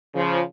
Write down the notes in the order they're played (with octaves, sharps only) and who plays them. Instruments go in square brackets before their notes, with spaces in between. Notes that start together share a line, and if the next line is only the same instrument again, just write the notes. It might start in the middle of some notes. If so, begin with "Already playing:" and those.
[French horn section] C#3 F3